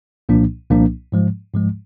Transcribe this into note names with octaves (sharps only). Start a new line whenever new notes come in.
C2 A#2 F3 A#3 D4
C2 A#2 F3 A#3 D4
G#2 F3 G#3
G#2 F3 G#3